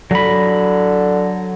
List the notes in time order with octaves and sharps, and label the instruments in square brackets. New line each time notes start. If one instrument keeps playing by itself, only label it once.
[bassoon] D3 [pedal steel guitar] F#3 B5